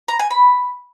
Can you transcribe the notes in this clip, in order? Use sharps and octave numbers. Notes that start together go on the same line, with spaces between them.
A#5
G#5
B5